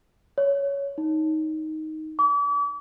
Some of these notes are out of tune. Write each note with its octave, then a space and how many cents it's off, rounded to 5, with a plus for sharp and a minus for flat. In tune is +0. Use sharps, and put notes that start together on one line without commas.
C#5 +10
D#4 +10
D6 -40